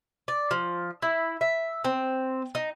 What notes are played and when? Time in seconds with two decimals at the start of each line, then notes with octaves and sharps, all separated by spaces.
0.28 D5
0.51 F3
1.02 E4
1.41 E5
1.84 C4
2.55 D#4